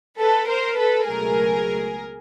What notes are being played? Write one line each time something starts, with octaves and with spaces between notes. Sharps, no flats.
A4 B4
A#4 C5
A4 B4
C#2 B2 F#3 A3 G#4 A#4